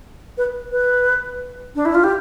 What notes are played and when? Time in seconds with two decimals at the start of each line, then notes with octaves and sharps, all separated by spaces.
0.38 B4
0.72 B4
1.75 D4
1.85 E4
1.95 F4
2.04 G4